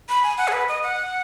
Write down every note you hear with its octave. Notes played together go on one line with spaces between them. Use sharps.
B5
G#5
F#5
G#4
B4
D#5
F#5